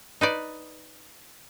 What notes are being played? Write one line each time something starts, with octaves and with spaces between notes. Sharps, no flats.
D#4 B4 D5